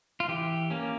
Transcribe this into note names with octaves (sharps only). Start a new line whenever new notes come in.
F4
E3 G4
A#3 C#4